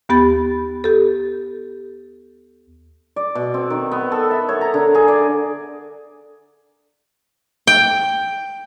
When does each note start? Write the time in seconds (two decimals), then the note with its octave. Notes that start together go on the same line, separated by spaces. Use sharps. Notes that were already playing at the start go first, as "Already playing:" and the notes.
0.09 D#2 B3 G4 B5 A6
0.84 G4 A4
3.16 D5
3.35 B2
3.54 C4
3.70 D#3
3.91 B3
4.12 A4
4.31 E5
4.49 C#5
4.61 A#5
4.74 D3
4.94 G#4
5.08 D5
7.67 G5